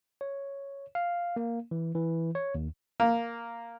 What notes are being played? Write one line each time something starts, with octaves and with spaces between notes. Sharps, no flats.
C#5
F5
A#3
E3
E3
C#5
D#2
A#3